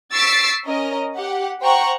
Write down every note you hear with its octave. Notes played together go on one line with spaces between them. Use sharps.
C#6 E6 A6 B6 C7 D7
C#4 A#4 D#5
G4 F#5
C5 F#5 G5 A#5 C#6